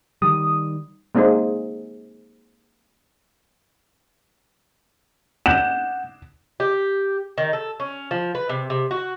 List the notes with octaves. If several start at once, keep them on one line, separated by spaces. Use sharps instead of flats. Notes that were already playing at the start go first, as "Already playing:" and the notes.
D#3 G3 D#6
G#3 A#3 C4 D#4 G#4
F#5 G6 E7
G4
D#3
A4
C#4
F3
B4
C3
C3
F#4